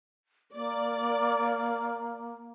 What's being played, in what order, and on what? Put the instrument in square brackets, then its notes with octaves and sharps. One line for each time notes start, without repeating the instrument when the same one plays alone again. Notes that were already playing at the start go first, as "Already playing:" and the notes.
[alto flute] A#3 [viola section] D5